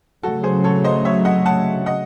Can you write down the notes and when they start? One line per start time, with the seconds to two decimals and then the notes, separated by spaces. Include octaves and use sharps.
0.23 C#3 F#3 A3 F#4 A4
0.43 G#4 C5
0.64 A4 C#5
0.84 C5 D#5
1.05 C#5 E5
1.25 D#5 F#5
1.46 F#5 A5
1.86 D#5 F#5